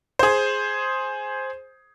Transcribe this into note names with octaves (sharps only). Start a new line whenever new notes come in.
G#4 C5